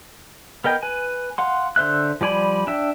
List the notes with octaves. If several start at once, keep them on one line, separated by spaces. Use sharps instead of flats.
B3 A#4 D#5 G5
B4 G#5
F5 F#5 C6
D3 C5 E5 F#6
F3 G3 D5 G#5 B5
D4 E5 G5